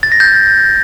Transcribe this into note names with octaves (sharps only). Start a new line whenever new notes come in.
A6
A#6
G6